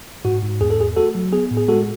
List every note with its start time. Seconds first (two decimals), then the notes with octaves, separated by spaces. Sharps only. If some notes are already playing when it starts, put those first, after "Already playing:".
0.25 G#2 F#4
0.42 G#2
0.61 E2 G#4
0.70 A4
0.79 E2 G#4
0.97 A3 F#4 A4
1.15 F#3
1.32 B3 G#4
1.51 A2
1.57 G#4
1.68 G#3 F#4 A4